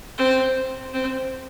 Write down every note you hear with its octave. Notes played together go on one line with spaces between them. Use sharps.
C4
C4